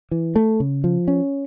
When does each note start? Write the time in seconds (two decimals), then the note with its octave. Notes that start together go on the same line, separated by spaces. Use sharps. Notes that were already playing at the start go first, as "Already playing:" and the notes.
0.11 E3
0.36 A3
0.60 C#3
0.84 F3
1.08 C#4